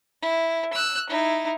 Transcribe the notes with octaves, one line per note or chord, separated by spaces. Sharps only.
E4
E6 F#6
D#4 E4